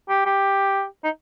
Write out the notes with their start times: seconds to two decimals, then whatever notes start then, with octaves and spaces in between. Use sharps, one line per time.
0.09 G4
0.26 G4
1.04 D#4